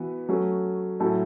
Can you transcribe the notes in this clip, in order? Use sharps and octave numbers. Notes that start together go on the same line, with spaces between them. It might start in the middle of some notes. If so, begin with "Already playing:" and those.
Already playing: E3 B3 F#4 B4
F#3 A3 C#4
A2 F#3 C#4 E4 A4